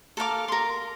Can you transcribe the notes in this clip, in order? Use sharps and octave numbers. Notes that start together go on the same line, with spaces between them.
A4 A#4 F5 D6
A#4 C6